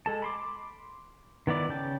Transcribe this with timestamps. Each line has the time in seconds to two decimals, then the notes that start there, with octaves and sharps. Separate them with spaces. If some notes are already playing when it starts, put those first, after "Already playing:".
0.06 G#3 A4 A5
0.22 B5 C6 D6
1.47 D#3 B3 E4 D5
1.69 C#3 G5 A5